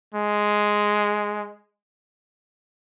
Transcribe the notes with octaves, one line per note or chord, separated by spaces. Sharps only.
G#3